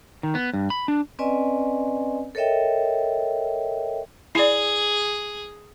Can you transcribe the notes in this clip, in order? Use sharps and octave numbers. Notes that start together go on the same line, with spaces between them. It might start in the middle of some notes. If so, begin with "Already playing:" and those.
D#3
B3
G2
B5
D4
C4 C#4 B4 D5 D#5 G#5
A4 A#4 C#5 D#5 E5 G5
E4 G#4 D5